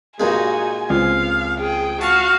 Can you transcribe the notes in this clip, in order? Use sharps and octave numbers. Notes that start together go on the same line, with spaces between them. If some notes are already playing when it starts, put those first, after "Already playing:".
G2 A#2 G#3 D#4 F#4 G#5
C#2 C4 F5
G#4 G5
F#4 F5 A5 C#6